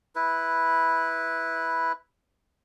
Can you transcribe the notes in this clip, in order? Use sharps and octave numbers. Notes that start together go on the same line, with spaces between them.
E4 B4